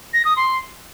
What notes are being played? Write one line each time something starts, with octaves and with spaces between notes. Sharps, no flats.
A#6
D#6
C6